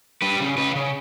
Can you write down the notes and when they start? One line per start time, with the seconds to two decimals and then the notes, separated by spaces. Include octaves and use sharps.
0.22 G3 B4
0.40 C#3
0.58 C#3 B4
0.75 C#3